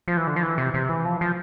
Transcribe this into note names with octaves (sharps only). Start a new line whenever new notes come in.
F3
E3
D3
F3
E3
C3
C3
E3
F3
F3